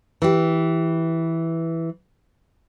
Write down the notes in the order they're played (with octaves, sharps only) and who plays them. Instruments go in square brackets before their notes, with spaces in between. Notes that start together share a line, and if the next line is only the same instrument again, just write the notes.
[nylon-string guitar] E3 G4